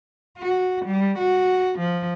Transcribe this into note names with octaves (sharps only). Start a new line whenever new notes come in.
F#4
G3
F#4
F3